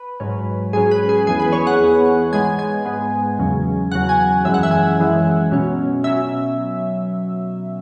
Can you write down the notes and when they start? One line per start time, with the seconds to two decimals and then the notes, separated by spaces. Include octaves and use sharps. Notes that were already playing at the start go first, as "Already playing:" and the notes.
Already playing: B4
0.20 G#2 F#3 C#4
0.73 G#2 F#3 C#4 G#4
0.91 B4
1.09 G#4
1.27 E2 E3 B3 G#4
1.40 B4
1.53 C#5
1.67 F#5
1.80 E2 E3 B3
2.32 G#2 G#3 B3 G#5
2.59 G#5
2.86 G#2 G#3 B3
3.39 E2 C#3 F#3
3.92 E2 C#3 F#3 F#5
4.09 G#5
4.45 F#2 E3 G#3 C#4 E5
4.54 F#5
4.63 E5
4.71 G#5
4.99 F#2 E3 G#3 C#4
5.52 B2 F#3 C#4
6.04 B2 F#3 C#4 E5